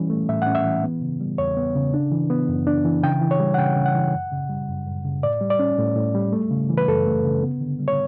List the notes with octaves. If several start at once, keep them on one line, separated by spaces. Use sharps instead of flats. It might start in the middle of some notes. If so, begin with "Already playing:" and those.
Already playing: E3 G3 C#4
A3
A2 E5
F#5
C#4
E5
E3
B3
C#3
G3
E2 C#5
B3
C#3
D4
E3
B3
F#2
D4
E3
C#3 G5
E3
C#5
G3
F#5
C#3 G5
C#3
F#5
E3
F#2
C#3
G3
F#2
F#2
C#3
A2 D5
G3
D5
C#4
A2
A2
G3
A3
C#3
E3
B4
F#2 A4
A3
C#3
B3
D3
G3
C#5